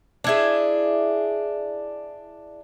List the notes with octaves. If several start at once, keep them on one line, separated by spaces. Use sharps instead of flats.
D4 E4 G#4